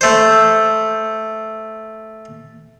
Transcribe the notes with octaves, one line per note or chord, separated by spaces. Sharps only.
A3 C5